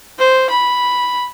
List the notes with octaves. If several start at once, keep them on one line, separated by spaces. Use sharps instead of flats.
C5
B5